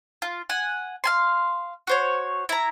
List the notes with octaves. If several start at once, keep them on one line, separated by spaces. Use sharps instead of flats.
F4
F#5 G#5
F5 G#5 C6
F#4 C5 C#5
E4 A#5